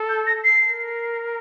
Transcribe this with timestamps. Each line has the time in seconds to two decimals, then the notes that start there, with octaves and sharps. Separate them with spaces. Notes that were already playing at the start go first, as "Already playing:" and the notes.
Already playing: A4
0.09 G6
0.27 A#6
0.44 C7
0.62 A#4